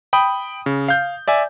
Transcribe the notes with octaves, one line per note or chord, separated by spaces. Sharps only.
G5 B5 D#6
C#3
F5 G6
D5 E5 G#5